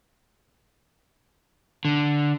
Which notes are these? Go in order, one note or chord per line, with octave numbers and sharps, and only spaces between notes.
D3